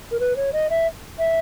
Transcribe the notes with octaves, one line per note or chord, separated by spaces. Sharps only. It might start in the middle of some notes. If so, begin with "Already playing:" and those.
A#4
B4
C#5
D#5
E5
E5